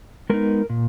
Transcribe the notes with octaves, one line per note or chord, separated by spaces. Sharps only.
G#3 B3 D#4 A#4
A#2